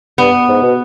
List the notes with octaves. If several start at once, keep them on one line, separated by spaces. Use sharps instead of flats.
G2 B3
G#2
B2